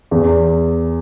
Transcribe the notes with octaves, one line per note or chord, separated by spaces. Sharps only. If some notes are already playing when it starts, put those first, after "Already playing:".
E2